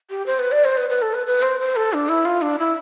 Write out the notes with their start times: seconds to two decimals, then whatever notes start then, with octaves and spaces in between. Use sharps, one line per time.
0.10 G4
0.26 C5
0.39 B4
0.52 D5
0.65 C5
0.77 B4
0.90 B4
1.02 A4
1.14 B4
1.27 B4
1.42 C5
1.60 C5
1.76 A4
1.93 D4
2.09 E4
2.25 F4
2.42 D4
2.59 E4